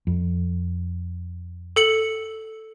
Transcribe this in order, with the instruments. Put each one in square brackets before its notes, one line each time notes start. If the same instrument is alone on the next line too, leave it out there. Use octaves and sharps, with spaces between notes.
[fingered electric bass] F2
[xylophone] A4 C#7 F#7